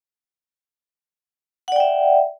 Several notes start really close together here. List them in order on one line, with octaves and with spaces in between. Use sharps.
F#5 D5 G5 E5